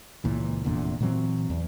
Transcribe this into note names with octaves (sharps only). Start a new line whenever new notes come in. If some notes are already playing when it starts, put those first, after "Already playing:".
C#2 A#2 E3
F1 E2 A#2 D3
A#2 E3 F#3 C4
E2